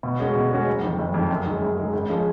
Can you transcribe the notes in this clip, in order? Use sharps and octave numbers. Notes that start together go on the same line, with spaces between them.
B2
G#3 C#4 F#4
B2
G#3 C#4 F#4
F#1
F2 D#3
F#1
F2 D#3
F#2
D#3 G#3
F#2
D#3 G#3
G#1
F3 G#3 C#4